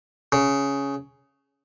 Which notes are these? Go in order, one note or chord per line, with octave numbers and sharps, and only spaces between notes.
C#3